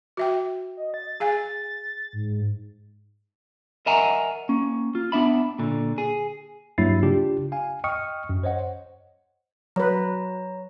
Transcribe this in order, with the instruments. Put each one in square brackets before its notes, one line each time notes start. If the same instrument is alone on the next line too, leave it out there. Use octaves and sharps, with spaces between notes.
[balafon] F#4 E5 G5
[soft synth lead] D#5
A6
[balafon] G#4 F5 G#5
[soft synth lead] G#2
[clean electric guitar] A#4 D#5 E5 F#5 G#5 A#5
A#3 C#4
F4
B3 D4 E5 B5
A#2 D3
G#4
[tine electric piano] G2 F#3 A#3 E4 A6 C7
C#3 D4 F4 G4
F5 G#5
D#5 G5 C#6 D#6 F6 C#7
F#2
C5 C#5 D#5 F#5
[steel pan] F#3 B4 [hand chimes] C#5 A#5